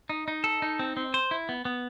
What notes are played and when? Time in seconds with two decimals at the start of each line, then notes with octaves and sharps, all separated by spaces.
0.09 D#4
0.28 D#4
0.44 A4
0.62 D#4
0.79 C4
0.97 C4
1.14 C5
1.31 E4
1.49 B3
1.65 B3